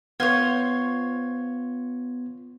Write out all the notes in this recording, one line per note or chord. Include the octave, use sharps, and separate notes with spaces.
B3 F4 C5 C#5 G#6